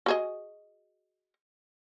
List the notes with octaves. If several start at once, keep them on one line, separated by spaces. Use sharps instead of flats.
F#4 G#4 D#5